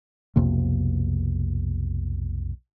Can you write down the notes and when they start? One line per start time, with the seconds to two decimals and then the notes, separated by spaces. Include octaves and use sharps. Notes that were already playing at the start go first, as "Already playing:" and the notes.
0.36 B1 F2 C3 A#3